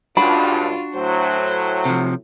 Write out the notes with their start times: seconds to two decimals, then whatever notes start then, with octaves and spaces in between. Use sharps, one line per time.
0.17 C#2 G2 D4 F4 F#4 B5
0.95 A2 F#3 C5
1.85 C3 F3